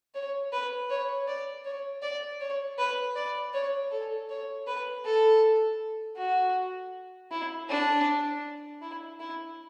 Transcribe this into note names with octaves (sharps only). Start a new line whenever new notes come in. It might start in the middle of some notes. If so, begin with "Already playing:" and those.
C#5
B4
C#5
D5
C#5
D5
C#5
B4
D5
C#5
A4
C#5
B4
A4
F#4
E4
D4
E4
E4